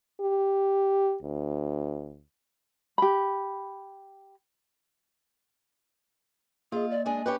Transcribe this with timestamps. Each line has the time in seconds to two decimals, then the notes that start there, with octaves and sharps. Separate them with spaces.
0.20 G4
1.23 D2
2.98 G4 B5
6.72 A#3 F4 G#4 D#5
6.91 D5
7.06 G#3 D4 G#4 G#5
7.26 C#4 G4 B4